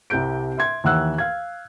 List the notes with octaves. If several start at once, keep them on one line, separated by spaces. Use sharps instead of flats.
C2 C3 G4 G6 D7
E5 C6 G#6
D#2 E3 F#5 E6 F#6
F5 G#6